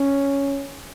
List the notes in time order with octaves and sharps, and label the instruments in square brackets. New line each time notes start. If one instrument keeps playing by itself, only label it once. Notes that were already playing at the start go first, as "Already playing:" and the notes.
Already playing: [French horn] C#4